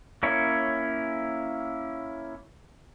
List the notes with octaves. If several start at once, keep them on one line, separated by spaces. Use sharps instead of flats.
A#3 C#4 E4 C#5